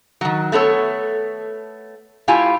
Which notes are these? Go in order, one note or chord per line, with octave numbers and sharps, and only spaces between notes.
D#3 F#3
A3 B3 A4 C#5
A2 E4 F4 G4 G#5